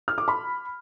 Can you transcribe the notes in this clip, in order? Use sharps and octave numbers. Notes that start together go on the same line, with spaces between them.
F6
D6
B5